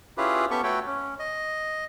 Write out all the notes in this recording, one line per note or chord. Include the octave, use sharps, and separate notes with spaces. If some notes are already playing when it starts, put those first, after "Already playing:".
C#4 E4 F4 G4 G#4 B4
B3 C#4 G4 A4 E5 C#6
A3 F#4 A4 B4 C#5 G5
C#4
D#5